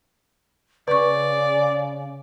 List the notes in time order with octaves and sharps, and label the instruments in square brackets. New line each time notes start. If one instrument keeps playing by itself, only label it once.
[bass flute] C#3 [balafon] B4 C#6 [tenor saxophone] D5